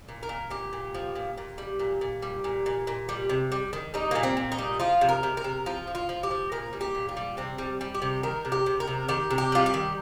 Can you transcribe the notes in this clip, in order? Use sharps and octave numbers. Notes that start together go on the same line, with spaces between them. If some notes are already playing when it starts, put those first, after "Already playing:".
A#2
A#4
A#2
A#2 G4
A#2
F3
A#2
A#2
G3
A#2
A#2
G3
A#2
A#2
A#2
G3
C3
G3
D#3
G3 D#4
A#2 A#3
C4
A#2
D#4
G3
F3 F4
C3
A#4
C3
A#4
C3
F3 F4
F3
F4
F3
G4
F3
A#2 A#4
G3
G4
A#2
F4
G3
C3 C4
G3
G3
G4
C3
D#3 A#4
C3
G4
C3
A#4
C3
D#3 G4
C3
G4
G3 F4
G4
D#3